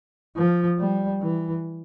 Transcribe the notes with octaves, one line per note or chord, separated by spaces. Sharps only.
F3
G3
E3